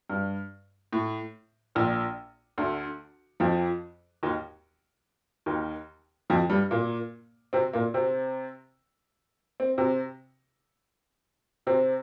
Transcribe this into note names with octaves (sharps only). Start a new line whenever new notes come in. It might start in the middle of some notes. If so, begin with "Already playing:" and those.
G2
A2
A#1 A#2
D2 D3
F2 F3
D#2 D#3
D#2 D#3
F2 F3
G2 G3
A#2 A#3
C3 C4
A#2 A#3
C3 C4
C4
C3 C4
C3 C4